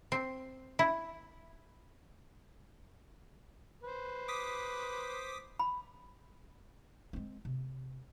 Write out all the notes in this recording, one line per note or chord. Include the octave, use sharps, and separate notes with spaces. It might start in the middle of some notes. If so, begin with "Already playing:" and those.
C4
E4
B4 C5
D6 D#6 B6
B5
G#3 C4
C3